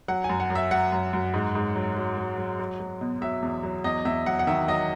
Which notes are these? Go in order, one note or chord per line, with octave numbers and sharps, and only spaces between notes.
F#3 F#5
G#5
F#2
F#5
F#2
E5
F#3 F#5
F#2
F#2
G#2
G#2
F#3
F#3
F#3
F#3
F#3
F#3
B2
F#3 E5
E2
F#3
E2 D#5
E2 E5
F#3 F#5
F#5
D#3 E5
F#3 D#5